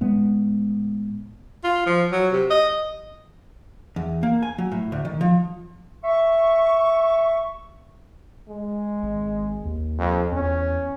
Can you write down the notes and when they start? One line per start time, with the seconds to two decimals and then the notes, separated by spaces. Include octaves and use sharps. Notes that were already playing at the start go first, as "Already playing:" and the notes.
0.01 A2 G#3 B3
1.64 F4
1.87 F3
2.12 F#3
2.32 C3
2.50 D#5
3.96 E2
4.23 A#3
4.43 G#5
4.58 F#3
4.72 A2
4.92 D2
5.05 D#3
5.21 F3
6.04 E5 C#6
8.49 G#3
9.03 G#1
9.65 D#2
9.98 F2
10.32 E2 C#4